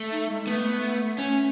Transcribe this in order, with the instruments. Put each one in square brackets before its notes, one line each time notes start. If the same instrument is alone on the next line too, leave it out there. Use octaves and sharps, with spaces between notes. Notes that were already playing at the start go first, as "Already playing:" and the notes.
Already playing: [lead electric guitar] A3
[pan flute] D#4
G#3
[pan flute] A3 [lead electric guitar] B3
[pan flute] A3 [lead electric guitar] C#4